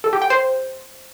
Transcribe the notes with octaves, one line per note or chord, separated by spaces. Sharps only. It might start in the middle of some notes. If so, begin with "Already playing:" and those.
A4
G4
G5
C5